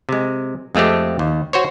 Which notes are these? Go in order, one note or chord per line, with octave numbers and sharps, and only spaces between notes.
C3 G#3
F2 G#3 A3 C4 G4
D#2
F#4 C5 C#5